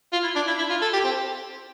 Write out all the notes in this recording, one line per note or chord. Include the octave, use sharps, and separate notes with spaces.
F4
E4
D4
E4
E4
F4
A4
G4
C4